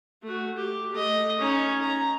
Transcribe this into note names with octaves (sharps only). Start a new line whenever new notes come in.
A3 F#4
G4
A3 D#5
C#4 D#4
A#5